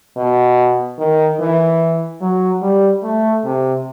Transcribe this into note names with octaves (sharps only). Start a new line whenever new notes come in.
B2
D#3
E3
F#3
G3
A3
C3